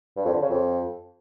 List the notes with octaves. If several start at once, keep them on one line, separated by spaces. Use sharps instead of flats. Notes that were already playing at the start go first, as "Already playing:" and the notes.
G2
F2
D3
C#3
F2